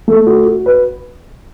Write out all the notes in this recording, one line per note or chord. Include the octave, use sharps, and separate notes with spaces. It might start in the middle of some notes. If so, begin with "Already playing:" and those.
A3
F#4
F#4
B4